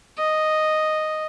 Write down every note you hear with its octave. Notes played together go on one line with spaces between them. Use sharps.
D#5